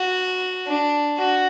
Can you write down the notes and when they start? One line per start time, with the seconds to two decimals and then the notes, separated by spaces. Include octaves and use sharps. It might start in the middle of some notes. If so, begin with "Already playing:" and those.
Already playing: F#4
0.67 D4
1.18 F#4